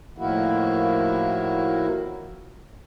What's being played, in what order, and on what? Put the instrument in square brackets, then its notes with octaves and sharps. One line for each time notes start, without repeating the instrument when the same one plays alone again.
[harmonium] A2 D#3 F3 A#3 E4 F#4